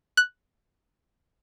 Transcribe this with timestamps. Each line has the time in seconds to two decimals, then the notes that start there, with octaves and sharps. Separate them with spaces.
0.17 F#6